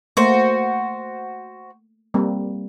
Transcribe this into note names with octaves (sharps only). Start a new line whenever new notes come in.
A3 A#3 F#4 C5
G3 A#3 C4